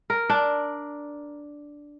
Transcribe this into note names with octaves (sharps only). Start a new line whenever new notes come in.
A#4
D4